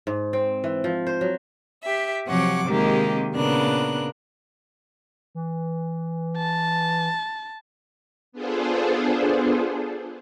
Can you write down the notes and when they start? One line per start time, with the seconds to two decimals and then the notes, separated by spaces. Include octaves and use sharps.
0.07 G#2
0.33 C4
0.64 E3
0.84 F3
1.07 C5
1.21 F#3
1.84 G4 E5
2.27 C3 F3 F#3 C#5 F#5 D6
2.66 C3 D#3 G#3 A#3 G4
3.36 A#2 C#3 B3 D4 A#4 F#6
5.35 E3
6.37 A5
8.32 B3 D4 F4 G#4 A4 C5